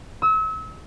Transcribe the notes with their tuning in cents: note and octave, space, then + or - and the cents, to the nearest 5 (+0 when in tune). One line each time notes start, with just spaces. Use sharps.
E6 -35